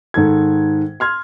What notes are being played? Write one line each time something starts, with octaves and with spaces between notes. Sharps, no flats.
G#2 D#3 A4 G#6
C6 F6 G#6